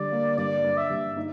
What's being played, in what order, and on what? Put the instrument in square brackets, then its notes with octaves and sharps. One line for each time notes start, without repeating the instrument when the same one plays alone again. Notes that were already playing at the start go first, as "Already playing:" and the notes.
Already playing: [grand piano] D3 G3 [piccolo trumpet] D5
[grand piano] A#3
[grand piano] G2 [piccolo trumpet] D5
[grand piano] G2
[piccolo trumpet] E5
[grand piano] G2
D#4